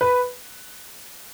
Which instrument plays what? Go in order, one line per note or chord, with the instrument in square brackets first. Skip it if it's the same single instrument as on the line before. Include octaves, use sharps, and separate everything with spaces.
[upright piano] B4